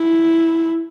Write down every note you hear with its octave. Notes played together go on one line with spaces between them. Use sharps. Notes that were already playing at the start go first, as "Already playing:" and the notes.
Already playing: E4